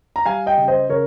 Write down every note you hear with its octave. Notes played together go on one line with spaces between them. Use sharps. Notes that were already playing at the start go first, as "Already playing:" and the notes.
A#5
G3 F5 G#5
D#5 G5
C#3
C5 D#5
C#3 A#4 C#5